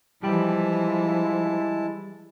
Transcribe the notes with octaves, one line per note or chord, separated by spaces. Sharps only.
E3 F3 G3 G#3 E4 G5 A5 B5